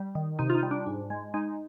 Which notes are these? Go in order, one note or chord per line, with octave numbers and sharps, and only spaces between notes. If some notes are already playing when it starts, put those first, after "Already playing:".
Already playing: G3
D#3
C3 D#4
F4
D#4
G3
D4
G#2
G#3
G#3 D#4